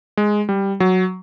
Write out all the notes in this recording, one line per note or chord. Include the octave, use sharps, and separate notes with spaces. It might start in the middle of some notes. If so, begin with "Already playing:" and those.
G#3
G3
F#3